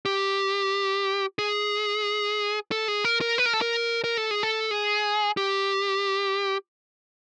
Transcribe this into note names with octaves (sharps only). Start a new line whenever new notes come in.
G4
G#4
A4
G#4
A#4
A#4
B4
A#4
A4
A#4
A#4
A4
G#4
A4
G#4
G4